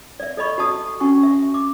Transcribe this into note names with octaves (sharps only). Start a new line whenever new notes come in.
D5 E5
A4 D5 D#5 B5 C#6
F#4 D5 A5 D#6
C#4 F#4 G#5 C#6
E5
D6